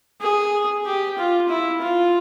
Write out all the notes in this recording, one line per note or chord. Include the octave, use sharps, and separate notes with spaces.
G#4
G4
F4
E4
F4